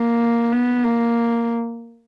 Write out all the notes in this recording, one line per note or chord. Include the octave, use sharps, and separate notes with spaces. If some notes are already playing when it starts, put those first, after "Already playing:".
Already playing: A#3
B3
A#3